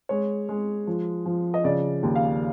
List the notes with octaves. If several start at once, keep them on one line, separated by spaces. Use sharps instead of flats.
G#3 C#5
G#3
F3
F3
D#5
C#3 D5
D#2
F5